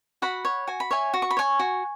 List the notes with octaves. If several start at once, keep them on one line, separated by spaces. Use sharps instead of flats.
F#4 F#5 B5
C#5
F#4 G#5
B5
C#5 E5 G#5
F#4
C#6
B5
C#5 G#5 C#6
F#4